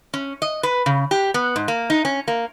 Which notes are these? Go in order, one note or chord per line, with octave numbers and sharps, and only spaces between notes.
C#4
D#5
B4
C#3
G4
B3
G#2
A#3
D#4
C#4
A#3